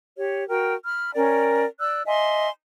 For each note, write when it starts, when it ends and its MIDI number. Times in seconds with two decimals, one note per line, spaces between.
0.16 0.48 67
0.16 0.48 73
0.49 0.74 66
0.49 0.74 70
0.49 0.74 79
0.84 1.14 83
0.84 1.14 89
1.14 1.65 61
1.14 1.65 70
1.14 1.65 74
1.14 1.65 79
1.79 2.01 74
1.79 2.01 88
1.79 2.01 90
2.06 2.49 75
2.06 2.49 76
2.06 2.49 80
2.06 2.49 84